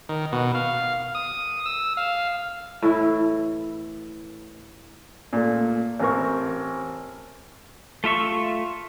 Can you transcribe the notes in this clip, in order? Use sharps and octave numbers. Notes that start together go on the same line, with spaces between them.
D#3
B2
F5
D#6
E6
F5
A2 E3 E4
A#2 A3
A1 C4 A#4 C#6
A3 F4 E5 C#6